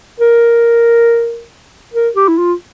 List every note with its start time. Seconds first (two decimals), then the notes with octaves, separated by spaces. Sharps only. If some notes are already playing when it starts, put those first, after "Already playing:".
0.20 A#4
1.94 A#4
2.16 G4
2.28 E4
2.38 F4